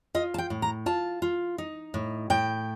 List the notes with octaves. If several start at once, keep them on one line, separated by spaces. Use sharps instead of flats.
F4 D#5
A5
G5
A2
A#5
F4 A5
F4
D#4
A2
A2 G5